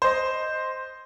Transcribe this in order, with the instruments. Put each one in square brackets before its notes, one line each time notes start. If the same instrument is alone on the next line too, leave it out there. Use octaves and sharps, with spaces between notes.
[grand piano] C5 D#5